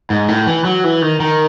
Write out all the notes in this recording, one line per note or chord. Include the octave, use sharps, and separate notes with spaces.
G#2
A2
E3
F#3
E3
D#3
D#3